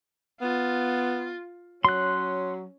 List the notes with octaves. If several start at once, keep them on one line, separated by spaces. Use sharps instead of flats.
B3 F4
F#3 C#4 C6 F#6